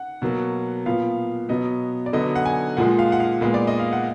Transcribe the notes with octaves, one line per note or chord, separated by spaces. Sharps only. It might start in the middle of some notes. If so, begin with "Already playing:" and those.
Already playing: F#5
B2 F#3 A#3
A#2 F3 B3 F5
B2 F#3 B3 D#5
D5
D3 F#3 B3 D#5
F#5
G#5
A#2 F3 G#3 F#5
F5
F#5
F5
A#2 G#3 B3
D5
D#5
F5
F#5